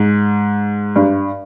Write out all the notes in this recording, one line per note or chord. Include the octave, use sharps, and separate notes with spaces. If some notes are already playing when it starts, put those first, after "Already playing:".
Already playing: G#2
G2